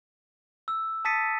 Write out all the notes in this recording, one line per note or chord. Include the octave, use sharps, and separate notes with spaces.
E6
A5 D#6 A6 B6 C#7 D#7